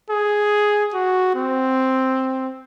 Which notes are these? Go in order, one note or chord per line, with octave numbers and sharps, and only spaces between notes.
G#4
F#4
C4